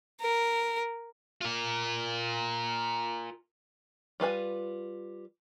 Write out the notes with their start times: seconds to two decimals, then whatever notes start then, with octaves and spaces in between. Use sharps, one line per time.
0.21 A#4
1.41 F4 A#4
4.20 G3 F4 B4 G#5